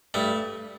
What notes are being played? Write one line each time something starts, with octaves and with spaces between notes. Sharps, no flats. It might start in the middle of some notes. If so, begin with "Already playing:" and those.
G2 A3